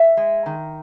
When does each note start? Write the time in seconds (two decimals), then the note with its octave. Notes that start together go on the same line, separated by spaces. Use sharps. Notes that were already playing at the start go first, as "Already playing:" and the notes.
Already playing: E5
0.17 G#3
0.46 D#3